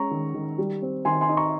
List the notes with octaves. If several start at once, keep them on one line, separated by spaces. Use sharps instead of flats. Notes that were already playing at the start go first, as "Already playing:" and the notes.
Already playing: G#3 C#4 A#5 C#6
D#3
D#3
G3
C4
D#3 G#5 C6
G#5 C6
D#4
A#5 C#6